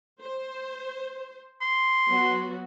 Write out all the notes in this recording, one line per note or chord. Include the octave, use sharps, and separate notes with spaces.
C5
C6
F#3 B3 F#4